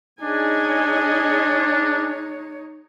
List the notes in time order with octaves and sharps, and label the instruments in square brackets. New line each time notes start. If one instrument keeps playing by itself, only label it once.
[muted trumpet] D4 [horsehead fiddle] D#4 C#5 [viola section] G#4 D#5 G#5